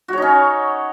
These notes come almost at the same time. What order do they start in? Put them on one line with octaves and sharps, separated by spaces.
F#4 C#5 D#4 C#4